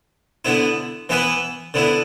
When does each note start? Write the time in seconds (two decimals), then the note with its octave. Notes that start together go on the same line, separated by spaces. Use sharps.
0.45 D3 B3 E4
1.09 E3 B3 E4 B4
1.74 D3 B3 E4